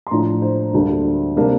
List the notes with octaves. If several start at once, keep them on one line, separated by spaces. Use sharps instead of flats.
C6
A2 F3 A3 D4 A#5
C5
D2 D3 G3 A#3 D4
C3 G3 A#3 D4